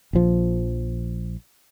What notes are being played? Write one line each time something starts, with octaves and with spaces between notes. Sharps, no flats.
A#1 F3